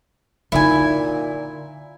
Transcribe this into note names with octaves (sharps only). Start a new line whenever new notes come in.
A#2 D3 D#4 E4 G#5